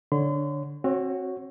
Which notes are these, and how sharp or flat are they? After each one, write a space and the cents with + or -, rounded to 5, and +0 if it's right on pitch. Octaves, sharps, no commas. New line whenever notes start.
D3 +0 C#5 -5 C6 -40
C4 +30 F#4 +0 C#5 +0